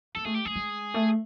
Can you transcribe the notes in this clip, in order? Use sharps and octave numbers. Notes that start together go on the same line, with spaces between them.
A#3 A4
A3 G#4
G4
A3 G#4
G#3
A3